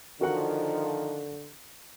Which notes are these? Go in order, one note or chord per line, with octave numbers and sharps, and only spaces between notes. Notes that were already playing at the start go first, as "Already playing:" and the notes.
D3 D#3 F3 F#4 A#4 F#5